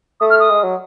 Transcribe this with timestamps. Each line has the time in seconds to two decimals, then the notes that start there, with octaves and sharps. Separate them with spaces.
0.20 A3 D#6
0.30 F6
0.40 D#6
0.50 G#3
0.64 F#3